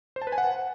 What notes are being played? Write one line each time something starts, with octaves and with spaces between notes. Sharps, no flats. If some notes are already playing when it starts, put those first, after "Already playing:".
C5
A5
B4
G#5
F#5